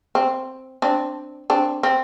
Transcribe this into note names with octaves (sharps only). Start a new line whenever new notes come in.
C4
C4 D4
C4 D4
C4